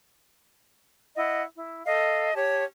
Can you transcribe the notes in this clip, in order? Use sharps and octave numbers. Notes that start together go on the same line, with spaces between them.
E4 D#5 F#5
E4
A4 D#5 F5
G4 C#5 A5